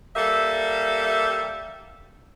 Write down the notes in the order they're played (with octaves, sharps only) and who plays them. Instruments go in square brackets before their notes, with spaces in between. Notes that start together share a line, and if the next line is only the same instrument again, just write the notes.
[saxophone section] G3 A#3 A4 E5